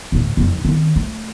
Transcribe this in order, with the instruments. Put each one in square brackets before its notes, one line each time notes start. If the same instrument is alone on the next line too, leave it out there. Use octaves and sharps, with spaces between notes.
[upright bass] D2 A2
F#1 F2
D#3 C4
A3